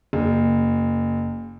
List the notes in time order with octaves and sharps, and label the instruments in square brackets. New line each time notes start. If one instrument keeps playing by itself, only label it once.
[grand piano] F#1